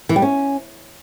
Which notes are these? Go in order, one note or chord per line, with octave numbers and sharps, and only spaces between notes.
E3
G3
C#4